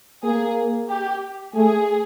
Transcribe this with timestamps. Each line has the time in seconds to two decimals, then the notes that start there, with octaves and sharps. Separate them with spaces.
0.24 A#3 G#4
0.89 G4
1.55 A3 G#4